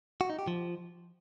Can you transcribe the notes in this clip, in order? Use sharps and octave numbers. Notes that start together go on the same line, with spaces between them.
F#4
D#4
G4
F3